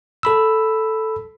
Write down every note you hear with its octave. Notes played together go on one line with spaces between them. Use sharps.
A4 B5 E6